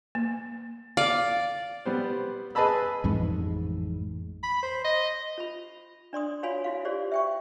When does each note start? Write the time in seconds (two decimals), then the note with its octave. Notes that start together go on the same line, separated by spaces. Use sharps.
0.15 A#3
0.97 D5 F5
1.86 G3 B3 C5
2.55 G#4 B4 D#5 A5 B5 E6
3.04 A1 F2 G#2 G#3
4.43 B5
4.63 C5
4.84 D#5
5.38 F4 B5
6.13 D4 D5 C6 D#6
6.43 F4 F#4 C#5 F5 G#5 B5
6.64 E4 F#4 F5
6.85 F4 G4 C5 D5
7.12 E5 G5 C#6